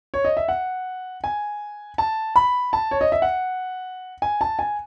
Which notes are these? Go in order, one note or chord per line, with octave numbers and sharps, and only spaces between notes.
C#5
D#5
E5
F#5
G#5
A5
B5
A5
C#5
D#5
E5
F#5
G#5
A5
G#5